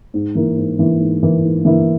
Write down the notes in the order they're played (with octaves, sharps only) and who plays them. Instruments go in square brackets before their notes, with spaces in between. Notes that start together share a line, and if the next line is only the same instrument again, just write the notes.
[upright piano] G#2
E3 A#3 E4
G#2
E3 A#3 E4
G#2
E3 A#3 E4
G#2
E3 A#3 E4